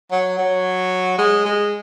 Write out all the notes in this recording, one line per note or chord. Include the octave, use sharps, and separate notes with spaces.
F#3
F#3
G#3
G#3